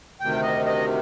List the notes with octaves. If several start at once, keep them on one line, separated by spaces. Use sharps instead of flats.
D2 C3 D#3 G5
D#5
D#5